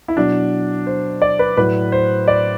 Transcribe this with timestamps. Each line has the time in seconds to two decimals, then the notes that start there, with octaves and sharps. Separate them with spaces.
0.08 E4
0.16 B2 F#3 D4
0.87 C5
1.22 D5
1.39 B4
1.57 A2 F#3 B4
1.92 C5
2.28 D5